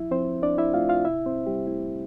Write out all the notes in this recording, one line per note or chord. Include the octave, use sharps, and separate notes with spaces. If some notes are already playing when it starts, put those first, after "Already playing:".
Already playing: F3 E4 E5
F3 C4 C5
D4 D5
E4 E5
A3 F4 F5
F4 F5
C3 E4 E5
C4 C5
C3
G3 G4
A3 E4